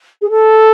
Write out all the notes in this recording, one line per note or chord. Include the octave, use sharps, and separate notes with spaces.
G#4
A4